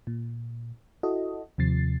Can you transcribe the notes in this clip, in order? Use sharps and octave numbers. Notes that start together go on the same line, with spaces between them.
A#2
E4 F#4 A4 D#5
D#2 C3 F3 A6 C7